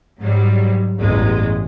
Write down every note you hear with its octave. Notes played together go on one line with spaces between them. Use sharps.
G#2 F#3 G3
A1 E2 G2 G#3